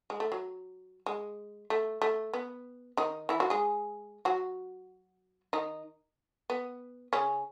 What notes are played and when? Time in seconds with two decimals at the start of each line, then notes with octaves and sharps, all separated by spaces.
0.10 G#3
0.20 A3
0.32 F#3
1.06 G#3
1.70 A3
2.02 A3
2.34 B3
2.97 D#3 D#4
3.29 E3 E4
3.40 F#3 F#4
3.50 G#3 G#4
4.25 F#3 F#4
5.53 D#3 D#4
6.50 B3
7.13 C#3 C#4